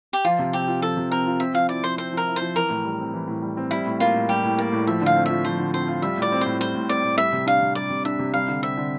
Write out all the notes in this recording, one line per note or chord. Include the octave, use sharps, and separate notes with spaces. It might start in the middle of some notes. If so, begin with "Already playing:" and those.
G4
F3 F4
C3
C4 G4
F4
F3 A4
C3
C4 A#4
F4
C4 E5
F3 F5
E4 D5
F3 C5
C4 C5
F3 A#4
E4
C5
F3
E3 A#4
A2
G3
C4
E3
A2
G3
C4
G3 E4
A2
A#3 F4
A2
G3 G4
A2
A#3 D5
A2
F3 E5
D3 F5
C4
F4 E5
F3 C5
D3
C4 C5
F4
G3 E5
A2 D5
C4
A2 C5
G3 C5
A2
C4 D5
A2
G3 E5
C3
D4 F5
C3
G3 D5
C3
D4 E5
C3
G3 F5
D3
C4 E5
D3